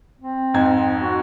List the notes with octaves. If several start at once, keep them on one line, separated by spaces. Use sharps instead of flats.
C4
F2 G#2 G#6
F#4